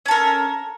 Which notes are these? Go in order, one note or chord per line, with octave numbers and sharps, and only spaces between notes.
C#4 A4 A#4